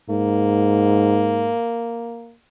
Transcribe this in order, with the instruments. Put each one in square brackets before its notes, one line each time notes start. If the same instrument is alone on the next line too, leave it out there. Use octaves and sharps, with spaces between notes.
[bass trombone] G#2 [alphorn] A#3